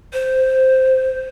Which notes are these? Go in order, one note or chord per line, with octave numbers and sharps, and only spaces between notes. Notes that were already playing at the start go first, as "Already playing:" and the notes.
C5